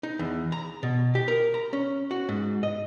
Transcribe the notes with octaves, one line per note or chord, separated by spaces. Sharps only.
D#4
E2
A#5
B2
G4
A#4
A#5
C#4
F#4
G#2
D#5